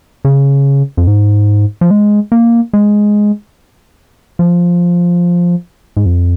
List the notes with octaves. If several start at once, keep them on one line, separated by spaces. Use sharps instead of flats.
C#3
F2
G#2
F3
G#3
A#3
G#3
F3
G#2
F2